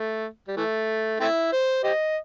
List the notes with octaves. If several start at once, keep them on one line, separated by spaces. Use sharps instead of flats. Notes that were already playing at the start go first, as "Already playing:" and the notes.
Already playing: A3
G3
E3 A3
A3 C4 E4
C5
G4 C5 D#5